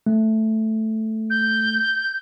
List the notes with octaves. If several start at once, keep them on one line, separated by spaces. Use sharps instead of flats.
A3
G6